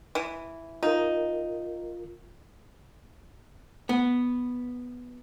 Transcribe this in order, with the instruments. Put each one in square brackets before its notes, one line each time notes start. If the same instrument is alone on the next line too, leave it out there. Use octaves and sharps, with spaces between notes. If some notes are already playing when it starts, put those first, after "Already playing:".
[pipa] E3
[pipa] D#4 [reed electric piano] F4 A#4
[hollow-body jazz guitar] B3